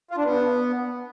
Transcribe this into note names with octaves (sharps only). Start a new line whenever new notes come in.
F4
D4
B3